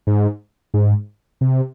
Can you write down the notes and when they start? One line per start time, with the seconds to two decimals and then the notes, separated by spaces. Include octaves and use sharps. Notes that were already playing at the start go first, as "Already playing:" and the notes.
0.07 G#2
0.74 G#2
1.41 C3